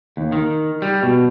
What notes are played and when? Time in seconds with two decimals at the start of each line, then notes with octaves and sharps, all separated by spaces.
0.17 D#2
0.32 D#3
0.82 G3
1.03 B2